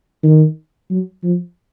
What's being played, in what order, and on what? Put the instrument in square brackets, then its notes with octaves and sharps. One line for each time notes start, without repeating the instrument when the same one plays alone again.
[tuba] D#3
F#3
F3